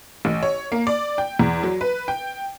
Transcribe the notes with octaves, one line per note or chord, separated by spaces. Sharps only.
A1
C#5
A#3
D5
G5
E2
F#3
B4
G5